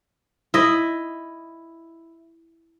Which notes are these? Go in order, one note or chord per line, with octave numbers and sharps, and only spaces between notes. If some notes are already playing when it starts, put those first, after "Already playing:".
E4 D#5